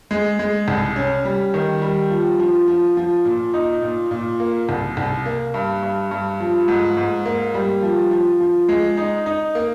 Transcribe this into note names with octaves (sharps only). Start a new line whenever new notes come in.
G#3
G#3
C2
C#4
G3
D#3
G3
F3
F3
F3
F3
A#2
D#4
A#2
A#2
A#3
C2
C2
A#3
G2
G2
G2
F3
G#2
G#2
A#3
G3
F3
F3
F3
G#3
D#4
D#4
A#3